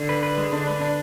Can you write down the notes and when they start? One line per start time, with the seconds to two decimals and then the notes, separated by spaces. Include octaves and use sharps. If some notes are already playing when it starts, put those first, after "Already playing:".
Already playing: D3
0.09 B4
0.23 B4
0.37 G#3
0.52 D3 D4
0.67 B4
0.81 D4